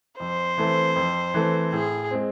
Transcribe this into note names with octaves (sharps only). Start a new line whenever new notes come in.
F2 C5
E3 A3 C4
F2
E3 A3 C4
A2 G#4
G#3 C4